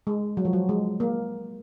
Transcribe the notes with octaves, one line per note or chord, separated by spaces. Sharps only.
G#3
F#3
F3
F#3
G#3
A#3